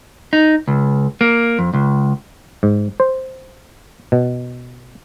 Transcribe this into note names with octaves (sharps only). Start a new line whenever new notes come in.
D#4
C#2
A#3
F2
C#2
G#2
C5
B2